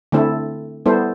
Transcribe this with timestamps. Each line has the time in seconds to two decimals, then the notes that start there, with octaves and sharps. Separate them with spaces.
0.12 D3 A3 C4 E4 A4
0.86 G3 B3 E4 A4 C5